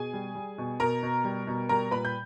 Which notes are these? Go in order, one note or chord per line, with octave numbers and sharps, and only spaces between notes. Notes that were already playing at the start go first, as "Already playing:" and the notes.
Already playing: B2 G#4 G#5
G3
G3
B2
B2 A#4 A#5
B2
G3
B2
G3 A#4 A#5
A#2 B4 B5
G6